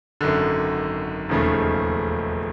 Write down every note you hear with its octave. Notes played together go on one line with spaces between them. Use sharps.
G#1 F#2 D3
E1 D#2 C#3 F3 A3